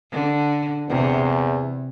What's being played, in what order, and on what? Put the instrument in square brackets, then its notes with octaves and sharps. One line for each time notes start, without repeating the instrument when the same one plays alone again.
[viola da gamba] D3
[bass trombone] E2 [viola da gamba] C3